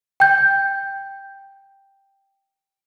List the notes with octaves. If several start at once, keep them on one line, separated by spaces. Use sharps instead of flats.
G5 G6